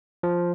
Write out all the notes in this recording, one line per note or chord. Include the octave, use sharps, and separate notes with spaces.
F3